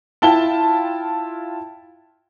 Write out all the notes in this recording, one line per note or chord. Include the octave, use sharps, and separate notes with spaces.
E4 F4 G5 A5 G7